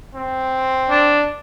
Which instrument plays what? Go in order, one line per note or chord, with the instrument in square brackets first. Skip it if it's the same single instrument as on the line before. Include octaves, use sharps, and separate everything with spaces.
[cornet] C4
[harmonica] D4